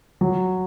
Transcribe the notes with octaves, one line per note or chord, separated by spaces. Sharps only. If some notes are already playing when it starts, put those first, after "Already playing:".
F#3